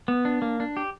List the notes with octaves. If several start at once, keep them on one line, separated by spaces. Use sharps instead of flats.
B3
D4
A#3
D4
G4